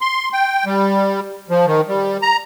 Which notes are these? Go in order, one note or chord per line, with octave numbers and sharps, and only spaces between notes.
C6
G5
G3
F3
D#3
G3
A#5